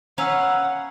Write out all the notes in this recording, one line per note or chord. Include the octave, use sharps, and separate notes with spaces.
C#4 B4 F5 F#5 A#5 E6